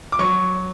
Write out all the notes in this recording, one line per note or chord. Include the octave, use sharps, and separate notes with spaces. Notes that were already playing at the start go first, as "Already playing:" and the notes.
D6
F#3 C#6